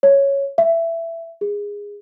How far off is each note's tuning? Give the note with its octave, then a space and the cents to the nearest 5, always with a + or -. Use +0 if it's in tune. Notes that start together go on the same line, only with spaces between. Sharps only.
C#5 +0
E5 +15
G#4 -20